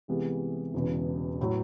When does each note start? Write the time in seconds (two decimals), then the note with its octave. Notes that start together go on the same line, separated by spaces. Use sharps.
0.08 C2 C3 E3 G#3 B3
0.74 E1 E2 C#3
1.41 A2 F#3